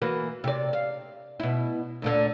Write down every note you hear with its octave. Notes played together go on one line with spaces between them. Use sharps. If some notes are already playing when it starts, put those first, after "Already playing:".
E3 A#3 F#4
C3 D5
F5
B2 E4
D2 A#2 D3